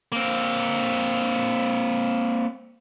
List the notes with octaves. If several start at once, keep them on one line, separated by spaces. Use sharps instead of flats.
A#3 C4